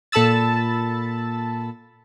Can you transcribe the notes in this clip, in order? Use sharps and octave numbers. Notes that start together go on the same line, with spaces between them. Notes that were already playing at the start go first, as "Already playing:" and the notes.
A#2 A4 A5 B5 E6 A6